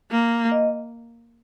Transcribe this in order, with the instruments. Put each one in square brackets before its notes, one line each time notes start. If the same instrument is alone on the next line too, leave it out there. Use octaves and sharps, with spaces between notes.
[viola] A#3
[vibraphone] D#5